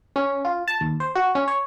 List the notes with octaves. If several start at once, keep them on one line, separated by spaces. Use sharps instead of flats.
C#4
F4
A5
D#2
C5
F#4
C#4
C#5